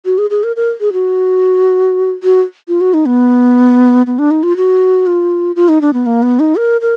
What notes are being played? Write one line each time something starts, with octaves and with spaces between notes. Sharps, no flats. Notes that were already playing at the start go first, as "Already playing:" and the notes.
F#4
G#4
G#4
A#4
A#4
G#4
F#4
F#4
F4
F#4
D#4
B3
B3
D4
D#4
F4
F#4
F4
F4
D#4
D4
B3
A#3
B3
D#4
A#4
A#4